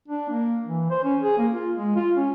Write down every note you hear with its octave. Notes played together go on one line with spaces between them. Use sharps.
D4
A#3
E3
C5
C#4
G#4
A#3
F4
G#3
F4
C#4